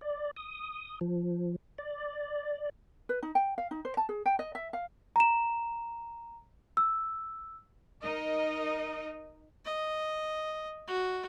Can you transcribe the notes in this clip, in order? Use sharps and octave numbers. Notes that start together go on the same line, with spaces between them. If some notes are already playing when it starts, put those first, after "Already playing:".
D5
D#6
F3
D5
B4
D#4
G5
F5
D#4
C5
A5
G#4
G5
D#5
E5
F5
A#5 E7
E6
D#4 A#4 D#5
D#5
F#4